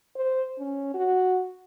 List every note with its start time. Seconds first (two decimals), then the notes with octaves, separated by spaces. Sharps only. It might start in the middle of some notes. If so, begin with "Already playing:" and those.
0.16 C5
0.59 C#4
0.94 F#4